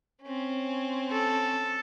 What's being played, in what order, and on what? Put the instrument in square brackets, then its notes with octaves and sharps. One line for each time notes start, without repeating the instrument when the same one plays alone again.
[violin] C4 C#4
[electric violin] A4